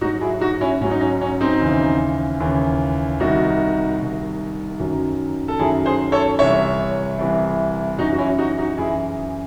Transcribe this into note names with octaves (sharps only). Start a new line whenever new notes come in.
G#2 F#3 D#4 F#4
E4 G#4
D#4 F#4
C#4 E4
G#2 F#3 C#4
D#4
C#4
C#4
C4 D#4
D#2 C#3 E3
D#2 C#3 E3
C2 C3 D#3 D#4 F#4
C2 C3 D#3
F#2 D#3 F#3
A4
F#2 D#3 F#3 E4 G#4
G#4 C5
A4 C#5
C2 C3 E3 C#5 E5
C2 C3 E3
F#2 E3 D#4 F#4
F#4
C#4 E4
D#4 F#4
D#4 F#4
F#2 E3 E4 G#4